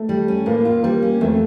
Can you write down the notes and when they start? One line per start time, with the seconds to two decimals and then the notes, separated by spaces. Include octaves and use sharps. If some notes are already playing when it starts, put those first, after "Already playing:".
Already playing: A3
0.09 G3
0.28 C#4
0.46 A2 A#3
0.65 F4
0.83 G3 A#3
1.02 C#4
1.21 F2 A3